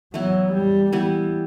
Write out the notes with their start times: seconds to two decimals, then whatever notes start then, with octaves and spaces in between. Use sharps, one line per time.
0.14 E3 F#3 B3 E4
0.53 G3
0.92 E3 G3 B3 E4